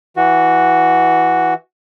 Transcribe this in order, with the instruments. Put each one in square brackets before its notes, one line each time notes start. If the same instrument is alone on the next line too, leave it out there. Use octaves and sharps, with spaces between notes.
[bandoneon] E3 F#4